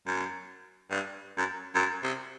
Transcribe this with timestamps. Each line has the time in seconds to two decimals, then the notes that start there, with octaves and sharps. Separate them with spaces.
0.07 F#2
0.91 G2
1.38 F#2
1.75 F#2
2.03 C3